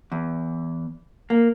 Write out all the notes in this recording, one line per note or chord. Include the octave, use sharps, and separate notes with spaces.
E2
A#3